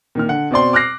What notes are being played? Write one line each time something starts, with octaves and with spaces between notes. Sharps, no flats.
A#2 D#3 F6
D3 F#5
B2 C4 D5 C6
D6 F6 F#6 A#6 C7